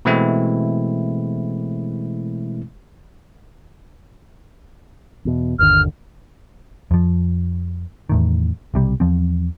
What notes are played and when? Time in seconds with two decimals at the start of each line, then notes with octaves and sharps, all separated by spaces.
0.05 B2 E3 G#3 A3 C4 E4
5.25 E2 B2
5.59 G1 D#2 D3 F6
6.91 F2 F3
8.09 E2 A2 D#3
8.74 B1 C3 G3
9.00 E2 F3 C4